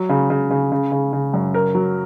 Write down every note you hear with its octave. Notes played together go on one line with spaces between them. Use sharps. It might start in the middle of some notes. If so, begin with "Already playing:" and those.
Already playing: F#3
C#3
C#3
C#3
C#3
C#3
C#3
F#2
A#4
F#3